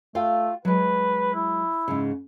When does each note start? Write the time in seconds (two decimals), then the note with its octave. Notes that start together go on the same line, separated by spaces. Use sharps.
0.15 A3 F4 F5 G5
0.65 F#3 G#3 B4
1.34 E4
1.88 G#2 C#3